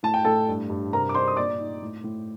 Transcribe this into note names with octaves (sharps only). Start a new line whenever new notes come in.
A2 A5
G5
A2 A4 A5
G2
G2
C3 A#4 A#5
D6
D4 C5 C6
D#6
A#2 D5 D6
D#4
A2
A2